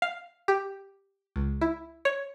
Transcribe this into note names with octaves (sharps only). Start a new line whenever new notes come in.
F5
G4
C#2
E4
C#5